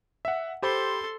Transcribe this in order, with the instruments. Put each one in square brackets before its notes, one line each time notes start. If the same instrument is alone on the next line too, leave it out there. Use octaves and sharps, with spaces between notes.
[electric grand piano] E5 F#5
[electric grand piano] G4 C5 B5 [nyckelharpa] A4 C6